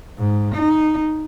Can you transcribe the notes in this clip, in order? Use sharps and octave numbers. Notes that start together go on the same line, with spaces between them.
G#2
D#4